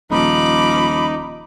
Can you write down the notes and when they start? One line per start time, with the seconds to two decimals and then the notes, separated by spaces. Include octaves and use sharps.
0.11 D#1 F3 D#4 B5 D6